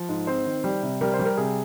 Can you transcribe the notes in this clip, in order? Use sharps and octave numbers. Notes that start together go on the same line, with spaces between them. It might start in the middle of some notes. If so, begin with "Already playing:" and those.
Already playing: F3
G#2
C4 C5
D#3
G3
C3
G3 A#4
C5
G3
A#4
C3 G#4